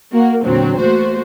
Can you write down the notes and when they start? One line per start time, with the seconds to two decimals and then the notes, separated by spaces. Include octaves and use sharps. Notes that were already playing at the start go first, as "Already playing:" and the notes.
0.12 A#3 F#4
0.44 E2 A#2 D3 F#3 C4
0.78 A3 A#3 F#4 C5